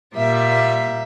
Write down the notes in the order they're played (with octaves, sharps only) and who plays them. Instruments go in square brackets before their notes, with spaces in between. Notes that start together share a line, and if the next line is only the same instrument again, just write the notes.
[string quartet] A#2 G3 A#3 E5